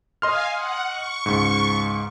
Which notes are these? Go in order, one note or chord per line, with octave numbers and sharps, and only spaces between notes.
D#5 F5 G#5 C6 F6
F#5
C#6
C#2 G#2